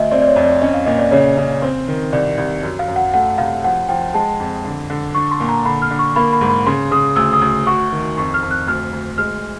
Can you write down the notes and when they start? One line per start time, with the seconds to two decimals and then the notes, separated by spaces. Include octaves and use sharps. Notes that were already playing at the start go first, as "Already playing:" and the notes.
Already playing: D2 D#5 E5
0.11 C4 D5
0.22 D5
0.27 C#5
0.36 F2
0.44 D5
0.62 C#4 D#5
0.74 F5
0.86 A#2 D#5
0.99 D5
1.11 C#3 C#5
1.37 C#3
1.62 C4
1.88 D#3
2.13 C2 D5
2.38 C2
2.63 F#2
2.79 F5
2.88 F#2
2.96 F#5
3.14 A3 F#5
3.38 C2 F5
3.64 F3 F#5
3.88 F3 G5
4.14 G#3 A5
4.40 F2
4.65 D3
4.90 D3
5.15 D4 C#6
5.31 C6
5.40 A#2
5.49 A#5
5.65 D3 B5
5.82 F6
5.91 D3
5.99 C#6
6.16 A#3 B5
6.32 B5
6.41 G#2
6.49 B5
6.66 C#3 C6
6.91 C#3 D#6
7.16 D2 E6
7.33 D#6
7.42 D2
7.67 F#4 C#6
7.92 D#3
8.17 F2 C#6
8.34 F6
8.42 F2
8.51 F#6
8.67 D2 F6
8.93 D2
9.18 G#3 F6